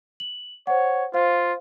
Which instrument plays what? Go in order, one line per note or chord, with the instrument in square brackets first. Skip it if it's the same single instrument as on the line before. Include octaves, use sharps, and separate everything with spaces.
[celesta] F#7
[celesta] C5 F#5 [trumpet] C#5
[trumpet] F4 [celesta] C5 F5